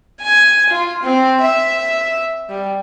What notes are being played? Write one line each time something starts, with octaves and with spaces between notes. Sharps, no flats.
G#5
F4
C4
E5
G3